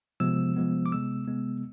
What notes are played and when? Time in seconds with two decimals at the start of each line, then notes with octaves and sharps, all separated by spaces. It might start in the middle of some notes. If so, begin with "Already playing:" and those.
0.20 C3 F3 G#3 B3 E6
0.56 C3 F3 G#3 B3
0.86 D6
0.91 C3 G#3 B3 E6
1.27 C3 G#3 B3